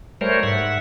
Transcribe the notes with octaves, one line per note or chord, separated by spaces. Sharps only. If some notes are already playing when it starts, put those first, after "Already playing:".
G3 A3 A#4 C5 C#5
G#2 E5 F#5